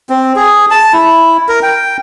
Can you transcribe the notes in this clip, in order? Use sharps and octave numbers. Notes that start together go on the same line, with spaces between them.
C4
G#4
A5
E4
A#4
G5